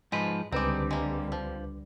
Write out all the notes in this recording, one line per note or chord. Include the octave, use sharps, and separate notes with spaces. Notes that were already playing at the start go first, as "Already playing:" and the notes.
G#2 F3 G#3 B4
C#2 D3 G3 G#3 C4 D#4 B4 D6
G#3 A#3
F3